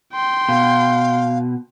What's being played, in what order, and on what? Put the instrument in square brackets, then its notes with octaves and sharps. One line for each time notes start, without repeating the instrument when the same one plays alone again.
[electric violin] G5 C6
[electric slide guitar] B2 [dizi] F5